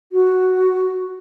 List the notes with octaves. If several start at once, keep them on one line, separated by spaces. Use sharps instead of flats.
F#4